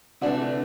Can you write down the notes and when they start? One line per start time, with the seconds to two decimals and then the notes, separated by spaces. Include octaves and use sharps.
0.21 C3 E3 A3 D4 F#4
0.41 D3